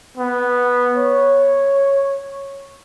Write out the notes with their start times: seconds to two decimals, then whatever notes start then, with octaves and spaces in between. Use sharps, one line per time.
0.17 B3
0.97 C#5